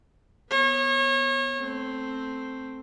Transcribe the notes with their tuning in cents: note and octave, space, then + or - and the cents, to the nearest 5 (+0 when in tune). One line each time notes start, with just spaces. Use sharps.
B3 +0 C#5 -30
A3 +0 C4 +0